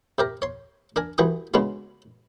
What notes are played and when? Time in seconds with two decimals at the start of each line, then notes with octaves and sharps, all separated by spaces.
0.18 C3 G4 A#4
0.42 C#5 C6
0.96 D4 A#4 G#5
1.18 C2 E3 F#4 G5 D#6
1.54 C#3 G#3 B3 D4 F#4